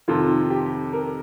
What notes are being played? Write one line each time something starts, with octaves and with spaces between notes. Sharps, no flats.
F2 C3 D#3 F4
G4
A#4